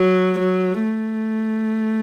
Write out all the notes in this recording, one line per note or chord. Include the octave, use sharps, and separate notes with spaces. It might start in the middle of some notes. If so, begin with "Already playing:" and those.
Already playing: F#3
F#3
A3